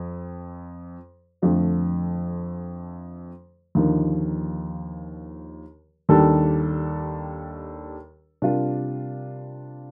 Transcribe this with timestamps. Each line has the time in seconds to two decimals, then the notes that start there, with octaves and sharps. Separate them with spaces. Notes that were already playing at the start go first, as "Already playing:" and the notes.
Already playing: F2
1.42 F2 D3 F3 A3
3.75 D#2 D3 F3 A#3 D#4
6.09 D#2 D#3 G3 D4 A4
8.42 C3 G3 D4 F4 A#4